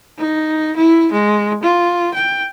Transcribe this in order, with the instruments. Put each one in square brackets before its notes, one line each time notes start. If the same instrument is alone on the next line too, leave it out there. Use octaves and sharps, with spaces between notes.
[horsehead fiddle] D#4
E4
G#3
F4
G5